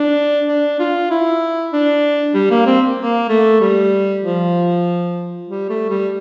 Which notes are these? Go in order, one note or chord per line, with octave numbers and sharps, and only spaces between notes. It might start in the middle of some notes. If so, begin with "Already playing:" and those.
Already playing: D4
D4
F4
E4
D4
G3
A#3
C4
A#3
A3
G3
F3
G3
A3
G3